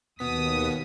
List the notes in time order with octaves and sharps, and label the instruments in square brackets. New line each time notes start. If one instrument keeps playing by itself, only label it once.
[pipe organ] D#2 D#6 [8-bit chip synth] B2 B3 B6